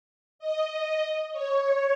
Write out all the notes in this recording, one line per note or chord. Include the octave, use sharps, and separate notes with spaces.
D#5
C#5